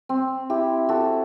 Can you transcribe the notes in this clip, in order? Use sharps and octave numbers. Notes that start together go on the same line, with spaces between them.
C4
E4 G4
F#4 A4